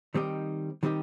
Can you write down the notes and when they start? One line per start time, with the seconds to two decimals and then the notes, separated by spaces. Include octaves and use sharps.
0.14 D#3 G3 C4 D#4 G4
0.83 D#3 G3 C4 D#4 G4